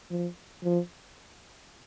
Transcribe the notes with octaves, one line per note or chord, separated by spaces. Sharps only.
F3
F3